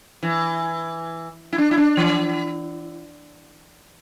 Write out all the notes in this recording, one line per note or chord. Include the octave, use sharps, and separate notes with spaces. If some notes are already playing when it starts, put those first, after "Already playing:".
E3
E4
D4
E4
D4
E3